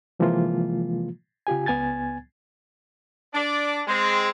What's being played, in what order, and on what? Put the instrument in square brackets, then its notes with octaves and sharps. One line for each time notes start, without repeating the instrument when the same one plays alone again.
[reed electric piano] C3 E3 F3 G#3 A#3 F4
C#3 F4 G4 G#5
C#2 B3 G#5 G#6 A6
[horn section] D4 D5
G#3 C4